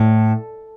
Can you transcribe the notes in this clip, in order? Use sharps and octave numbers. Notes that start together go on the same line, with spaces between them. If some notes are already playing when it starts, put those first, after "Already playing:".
Already playing: A2